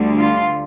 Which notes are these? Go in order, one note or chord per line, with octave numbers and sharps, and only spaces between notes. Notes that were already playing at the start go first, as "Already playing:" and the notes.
Already playing: D2 D3 G3
F4